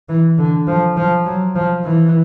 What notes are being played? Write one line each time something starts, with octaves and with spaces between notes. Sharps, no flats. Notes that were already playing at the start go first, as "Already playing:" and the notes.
E3
D3
F3
F3
F#3
F3
E3